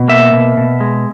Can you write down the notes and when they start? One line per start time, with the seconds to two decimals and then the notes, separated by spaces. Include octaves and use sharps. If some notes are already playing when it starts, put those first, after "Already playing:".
Already playing: B2
0.08 A#3 E5
0.33 B2
0.57 B2
0.80 G#3